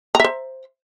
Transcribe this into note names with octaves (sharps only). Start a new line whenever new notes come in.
C5 E5 A#5